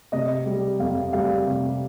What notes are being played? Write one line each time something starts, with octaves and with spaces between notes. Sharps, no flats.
C3 D#5
G3
F2 F5
G3 F5
C3